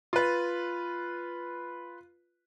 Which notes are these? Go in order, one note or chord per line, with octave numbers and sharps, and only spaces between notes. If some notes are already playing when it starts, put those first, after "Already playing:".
F4 B4